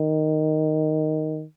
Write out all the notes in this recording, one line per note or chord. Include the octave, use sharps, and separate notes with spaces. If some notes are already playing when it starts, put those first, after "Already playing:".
Already playing: D#3